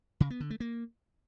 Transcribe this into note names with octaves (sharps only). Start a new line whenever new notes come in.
C#3
B3
D3
A3
A#3